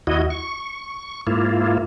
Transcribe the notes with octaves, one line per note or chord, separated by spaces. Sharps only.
D#2 E4 F#4 D#5
C#6
G#2 A#3 E4 F4